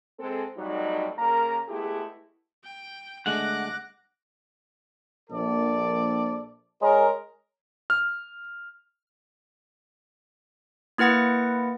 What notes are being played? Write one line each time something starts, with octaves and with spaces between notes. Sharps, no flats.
G#3 C4 A4
F2 A2 F#3 G3 D#4
C#3 A#3 A#4 A#5
G#3 A3 B3 E4 G4 G#4
G5
D3 G#3 A3 F#5 D6 F#6 A#6
A#1 A4 D5
G#3 A#4 C#5
F6
A#3 E4 B4 F#5 A#6